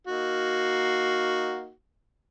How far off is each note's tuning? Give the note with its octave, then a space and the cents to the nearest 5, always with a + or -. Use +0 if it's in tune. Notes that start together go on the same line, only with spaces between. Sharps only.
A#3 +0 D#4 +0 F#4 +0